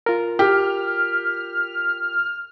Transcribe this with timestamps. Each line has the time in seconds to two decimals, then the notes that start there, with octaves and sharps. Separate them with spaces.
0.06 F4 A#4
0.39 G4 F6